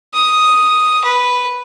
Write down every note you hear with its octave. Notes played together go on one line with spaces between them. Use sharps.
D#6
B4